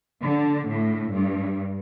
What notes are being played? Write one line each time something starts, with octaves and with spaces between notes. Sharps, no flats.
D3
A2
G2